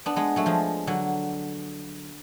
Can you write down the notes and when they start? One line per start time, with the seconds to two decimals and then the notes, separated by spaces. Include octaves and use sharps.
0.06 B3 D4
0.16 G#3 B3
0.36 F#3 A3
0.46 F3 G#3
0.87 D3 F#3